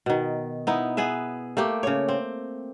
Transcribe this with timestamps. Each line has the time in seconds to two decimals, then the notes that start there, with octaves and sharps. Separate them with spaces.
0.06 B2 D#3
0.67 B3 D#4 E4
0.97 B3 G#4 B4 E5
1.57 A3 A#3 G4
1.83 C#3 C#5
2.08 C4